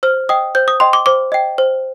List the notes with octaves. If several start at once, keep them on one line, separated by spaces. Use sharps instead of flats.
C5 F6
D#5 G5 D#6
C5 G6
D#6
D#5 G5 C6
D6
C5 D6
D#5 G5
C5